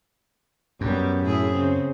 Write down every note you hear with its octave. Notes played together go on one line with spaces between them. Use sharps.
F#2 G3 B3
A2 E4 G#4
C#3 C4